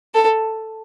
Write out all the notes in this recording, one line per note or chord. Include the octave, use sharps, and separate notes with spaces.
A4